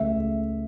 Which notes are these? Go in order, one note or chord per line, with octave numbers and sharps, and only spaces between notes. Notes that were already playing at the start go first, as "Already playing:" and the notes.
Already playing: C#2 A3 E5